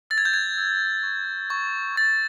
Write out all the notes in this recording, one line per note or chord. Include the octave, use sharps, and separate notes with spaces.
E6 A6
G#6
G6
G#6
E6
C#6
C#6
C#6 A6